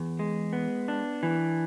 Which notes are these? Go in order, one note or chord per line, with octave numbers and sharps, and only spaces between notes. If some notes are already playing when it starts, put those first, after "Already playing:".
Already playing: E2
G#3
B3
D4
E3